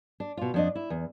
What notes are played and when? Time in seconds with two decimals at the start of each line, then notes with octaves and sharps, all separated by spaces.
0.20 D4
0.37 B2 F4
0.54 F2 D4 D#5
0.75 E4
0.90 E2